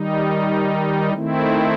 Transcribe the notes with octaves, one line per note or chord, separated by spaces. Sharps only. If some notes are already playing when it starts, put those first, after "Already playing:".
Already playing: D#3 G3 D#4
D#3 A3 C4 E4